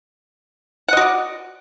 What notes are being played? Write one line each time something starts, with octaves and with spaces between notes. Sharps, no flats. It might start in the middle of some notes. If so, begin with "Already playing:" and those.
F#4 D5 D#5 F#5